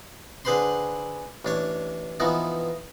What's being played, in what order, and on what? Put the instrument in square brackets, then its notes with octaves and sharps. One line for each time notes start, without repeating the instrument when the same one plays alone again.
[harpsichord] D3 G#4 B4 C5 B5 C6
A1 D4 C#5
E3 F3 B3 D#4